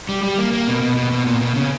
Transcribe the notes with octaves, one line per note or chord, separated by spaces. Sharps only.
G3
G3
A#3
A#3
B2
B2
B2
B2
A#2
B2
C#3